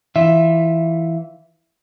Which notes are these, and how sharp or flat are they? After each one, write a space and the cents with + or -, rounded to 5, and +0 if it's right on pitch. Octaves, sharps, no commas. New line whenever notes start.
E3 +0 F4 +0 E5 +0